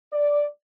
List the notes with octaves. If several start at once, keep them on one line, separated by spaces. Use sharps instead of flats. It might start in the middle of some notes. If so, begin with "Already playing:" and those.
D5